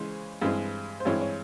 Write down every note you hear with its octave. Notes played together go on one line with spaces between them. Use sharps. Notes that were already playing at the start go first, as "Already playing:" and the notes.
Already playing: C#3 E3 G#3 C5
G2 E3 G#3 C4
C5
G2 E3 G#3 C4 C#5
C#5